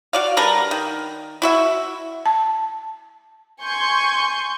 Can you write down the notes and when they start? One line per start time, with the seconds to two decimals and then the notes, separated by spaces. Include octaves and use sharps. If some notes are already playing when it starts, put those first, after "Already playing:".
0.13 F#4 D5 F5
0.37 G3 D4 A#4 B4
0.71 D#3
1.42 E4 F#4 E5
2.26 A5
3.62 G#5 C6 C#6 G6